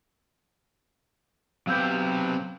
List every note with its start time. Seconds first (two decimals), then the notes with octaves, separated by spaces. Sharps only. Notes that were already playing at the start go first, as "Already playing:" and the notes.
1.67 C3 F#3 B3 G4 B4 F5 E6 G6